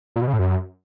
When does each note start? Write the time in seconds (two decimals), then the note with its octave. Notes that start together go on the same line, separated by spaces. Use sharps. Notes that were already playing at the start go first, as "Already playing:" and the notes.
0.16 A#2
0.22 B2
0.27 C#3
0.33 A2
0.39 F#2